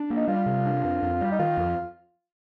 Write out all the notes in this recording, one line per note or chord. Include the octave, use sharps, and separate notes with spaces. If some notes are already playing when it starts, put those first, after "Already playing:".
Already playing: D4
A#3
D#4
G3 F4
C3
D4
F2
F2
G3
D#4
D#3 F4
F2